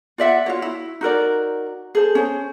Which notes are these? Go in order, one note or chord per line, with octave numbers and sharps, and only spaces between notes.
F4 D5 E5 F#5
F4 F#4 C#5
E4
D#4 F#4 A#4 D5
G#4 A4 C5
C#4 C5